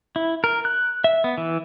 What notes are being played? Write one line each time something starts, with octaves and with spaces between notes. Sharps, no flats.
E4
A#4
F#6
E5
B3
E3